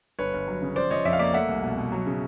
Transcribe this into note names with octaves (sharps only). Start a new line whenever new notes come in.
G1 B4 C#5
G1
F#3
C#3
F3 C5 D5
F3 C#5 D#5
F2 D5 E5
F5
A#3 D5 E5
A3 E5 F#5
C2
B2
B2
F#3
C#3